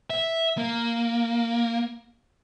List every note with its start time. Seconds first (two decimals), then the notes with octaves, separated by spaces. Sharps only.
0.10 E5
0.58 A#3